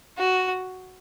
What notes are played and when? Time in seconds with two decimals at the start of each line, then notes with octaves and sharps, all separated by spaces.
0.18 F#4